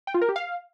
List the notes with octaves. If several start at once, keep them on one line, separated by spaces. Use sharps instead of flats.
G5
F4
A#4
G4
F5